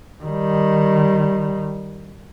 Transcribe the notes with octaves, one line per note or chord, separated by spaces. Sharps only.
D#3 G3